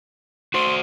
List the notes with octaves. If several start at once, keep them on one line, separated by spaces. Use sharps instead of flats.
F#4 C5 C6